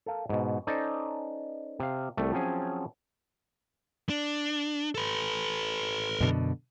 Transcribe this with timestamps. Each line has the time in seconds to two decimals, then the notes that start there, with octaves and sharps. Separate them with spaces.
0.06 A4 A#4 F5
0.29 G#2 B2
0.67 C#4 D#4 A4 C5 D5
1.80 C3 F5
2.17 C2 G3 A3
2.32 F3 F#3 C4 C#4 G#4
4.09 D4
4.95 A4 B4
6.21 F#2 B2 D3